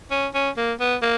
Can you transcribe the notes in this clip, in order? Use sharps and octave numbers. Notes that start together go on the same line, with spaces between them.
C#4
C#4
A#3
B3
A#3